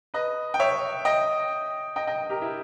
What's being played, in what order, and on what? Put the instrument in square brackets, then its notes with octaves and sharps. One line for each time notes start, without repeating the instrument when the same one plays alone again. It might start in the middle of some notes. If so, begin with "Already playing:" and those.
[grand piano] B4 D#5
G5
C#5 E5
D#5 G5
D#5 G5
D#5 G5
G4 A#4
E4